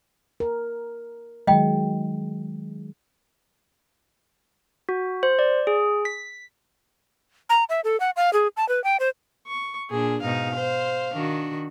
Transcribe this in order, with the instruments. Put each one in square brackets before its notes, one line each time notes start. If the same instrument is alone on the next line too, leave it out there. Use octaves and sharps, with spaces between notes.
[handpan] A#4
[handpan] D#3 F#3 G#3 [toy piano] D#5 G5
[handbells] F#4
C5
D5
G#4
B6
[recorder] A#5
E5
A4
F#5
F5
G#4
A5
B4
G5
C5
[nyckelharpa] C#6
[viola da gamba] A#2 D4 [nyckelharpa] G#4
[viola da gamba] G#2 B2 D#4 [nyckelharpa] F5
[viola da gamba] C5
D#3 D4 F#4